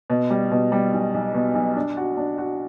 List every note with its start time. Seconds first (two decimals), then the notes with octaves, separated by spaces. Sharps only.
0.10 B2
0.30 G3
0.51 B2
0.72 G3
0.93 B1
1.14 B1
1.34 B2
1.55 B1
1.75 D4
1.97 F#4
2.17 D4
2.38 F#4